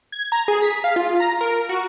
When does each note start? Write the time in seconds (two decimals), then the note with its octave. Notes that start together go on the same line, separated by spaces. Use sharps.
0.12 G#6
0.32 A#5
0.48 G#4
0.62 B6
0.84 F5
0.96 F4
1.20 A#5
1.41 A#4
1.69 F#4